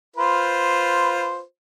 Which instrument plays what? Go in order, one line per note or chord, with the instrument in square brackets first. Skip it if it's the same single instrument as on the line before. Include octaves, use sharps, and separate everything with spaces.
[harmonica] F4 B4 C5